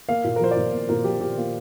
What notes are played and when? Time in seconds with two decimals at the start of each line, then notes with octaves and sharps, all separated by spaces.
0.09 A#3 F5
0.24 A#2
0.36 A#4
0.41 F3 C5
0.51 D5
0.57 A#2
0.73 A#3
0.89 A#2 A#4
1.04 F3 G4
1.21 A#2 G4
1.37 A#3 F4